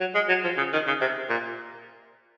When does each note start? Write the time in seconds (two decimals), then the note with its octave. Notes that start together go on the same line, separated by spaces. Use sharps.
0.01 F#3
0.15 G#3
0.29 F#3
0.44 F3
0.57 C#3
0.73 D#3
0.87 C#3
1.01 C3
1.30 A#2